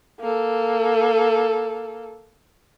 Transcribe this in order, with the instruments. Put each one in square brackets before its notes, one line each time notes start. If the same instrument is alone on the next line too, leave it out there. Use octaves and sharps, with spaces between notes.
[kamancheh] A#3 A4